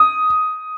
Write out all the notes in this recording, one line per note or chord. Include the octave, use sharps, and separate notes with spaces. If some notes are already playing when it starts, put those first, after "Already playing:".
Already playing: D#6